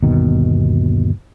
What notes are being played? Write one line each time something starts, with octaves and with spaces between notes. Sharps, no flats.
G1 D#2 B2 D#3